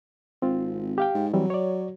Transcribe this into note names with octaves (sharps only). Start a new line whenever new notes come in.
G#1 C4 F4
G4 F5 G5
G#2
E3 F#3 G3 C4
C#5 D5